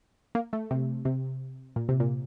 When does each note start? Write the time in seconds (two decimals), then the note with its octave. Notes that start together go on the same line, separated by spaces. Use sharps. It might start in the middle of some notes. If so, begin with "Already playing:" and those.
0.35 A#3
0.53 A3
0.71 C3
1.05 C3
1.76 A#2
1.89 C3
2.00 A#2